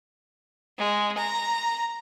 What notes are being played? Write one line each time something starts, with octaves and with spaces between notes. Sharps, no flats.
G#3
A#5